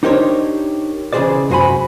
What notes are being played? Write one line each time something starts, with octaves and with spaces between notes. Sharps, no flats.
D4 D#4 G4 A#4 C5 C#5
C#3 E3 F4 G#4 C5 D5
C2 F#2 F#4 C5 G#5 B5